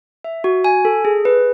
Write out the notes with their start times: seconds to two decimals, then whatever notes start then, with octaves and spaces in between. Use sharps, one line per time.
0.24 E5
0.44 F#4
0.64 G#5
0.85 A4
1.05 G#4
1.25 B4